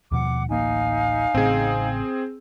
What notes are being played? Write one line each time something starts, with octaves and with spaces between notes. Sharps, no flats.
D#2 B2 F3 F#5 D6
D1 A1 A#3 D#4 F5 G#5
A1 A2 C#3 C4 G#4